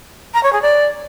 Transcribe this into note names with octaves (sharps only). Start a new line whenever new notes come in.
A#5
C#5
G#4
D5